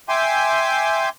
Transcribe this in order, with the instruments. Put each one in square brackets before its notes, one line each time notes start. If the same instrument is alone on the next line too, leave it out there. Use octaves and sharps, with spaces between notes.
[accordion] E5 G5 G#5 C6 D6